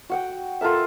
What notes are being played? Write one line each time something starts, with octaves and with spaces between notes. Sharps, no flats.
F#4 F#5 G5
F4 A4 A#4 E5